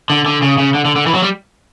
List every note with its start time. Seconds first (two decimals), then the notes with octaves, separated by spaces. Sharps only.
0.10 D3
0.26 D3
0.42 C#3
0.58 C#3
0.74 D3
0.85 D3
0.96 D3
1.07 E3
1.15 F#3
1.22 G3